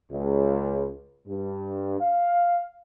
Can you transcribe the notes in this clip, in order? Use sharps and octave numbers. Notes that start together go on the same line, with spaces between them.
C#2
G2
F5